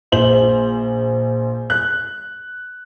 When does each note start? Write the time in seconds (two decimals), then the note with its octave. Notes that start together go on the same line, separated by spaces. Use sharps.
0.12 A#1 C5 F#7
1.70 F#6